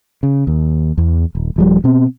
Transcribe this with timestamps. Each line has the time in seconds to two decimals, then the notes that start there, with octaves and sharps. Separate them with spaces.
0.23 C#3
0.47 D#2
0.98 E2
1.35 D#1
1.56 D#1 F3 G3
1.84 B2 C4